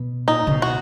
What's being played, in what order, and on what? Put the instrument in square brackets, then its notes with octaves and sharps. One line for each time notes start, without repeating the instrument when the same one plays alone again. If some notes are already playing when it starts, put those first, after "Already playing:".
Already playing: [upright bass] B2
[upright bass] A#2 [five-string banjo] D#4
[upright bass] D3
B2
[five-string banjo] F#4